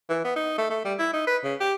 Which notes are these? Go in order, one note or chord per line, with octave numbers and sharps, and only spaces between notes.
E3
B3
D#4
A3
A3
G3
E4
D#4
B4
C#3
G4